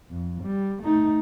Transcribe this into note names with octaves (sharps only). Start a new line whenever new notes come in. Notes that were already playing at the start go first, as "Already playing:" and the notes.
F2
G3
A3 D#4